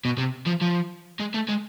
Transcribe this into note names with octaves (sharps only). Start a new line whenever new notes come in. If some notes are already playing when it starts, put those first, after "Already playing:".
B2
C3
F3
F3
G#3
A3
G#3